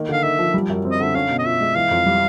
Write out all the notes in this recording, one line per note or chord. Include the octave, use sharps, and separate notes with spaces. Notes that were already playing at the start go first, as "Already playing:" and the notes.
Already playing: D#3 A#3
D3 F5
D#4 E5
F3
G3
F#2
C4
D#5
D3 E5
C#4 F5
B2
D#5
F4 E5
G#3
E3 F5
F2
G3